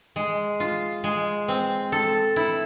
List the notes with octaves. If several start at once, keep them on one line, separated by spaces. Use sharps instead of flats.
G#3
F4
G#3
C4
A4
E4